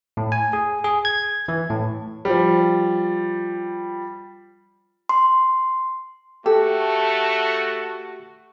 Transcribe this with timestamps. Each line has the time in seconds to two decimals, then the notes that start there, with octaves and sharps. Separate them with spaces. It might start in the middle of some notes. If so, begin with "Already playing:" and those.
0.17 A2
0.32 G#5
0.53 G#4
0.84 G#4
1.05 G#6
1.48 E3
1.70 A2
2.25 F3 G3
5.09 C6
6.46 A3 F#4 G4 A4